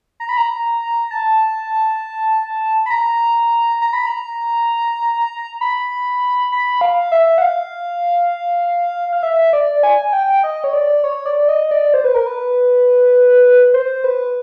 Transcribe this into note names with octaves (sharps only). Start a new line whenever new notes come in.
A#5
B5
A#5
A5
B5
A#5
A#5
B5
A#5
B5
B5
F5
E5
F#5
F5
F5
E5
D5
G#5
G5
D#5
C#5
D5
C#5
D5
D#5
D5
C5
B4
A#4
B4
C5
B4